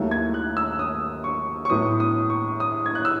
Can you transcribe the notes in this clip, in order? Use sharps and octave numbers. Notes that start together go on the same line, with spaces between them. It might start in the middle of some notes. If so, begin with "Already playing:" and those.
Already playing: D#2 D#3 F#3 A3 E4
G#6
F#6
E6
D#6
C#6
C#6
A2 F#3 B3 E4 D#6
D#6
C#6
D#6
G#6
F#6
E6